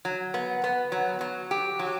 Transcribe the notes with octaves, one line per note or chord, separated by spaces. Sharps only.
F#3
B3
B3
F#3
F#3
G4
F#3